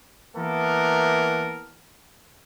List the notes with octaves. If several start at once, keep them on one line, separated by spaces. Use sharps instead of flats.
E3 A#3 B3 A4 A#4